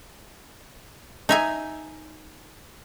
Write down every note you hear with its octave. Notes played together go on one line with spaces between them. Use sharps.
D#4 E5 G#5